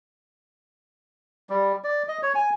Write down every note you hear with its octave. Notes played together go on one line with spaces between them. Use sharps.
G3
D5
D#5
C#5
G#5